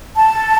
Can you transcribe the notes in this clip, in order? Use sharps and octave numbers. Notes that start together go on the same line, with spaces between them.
A5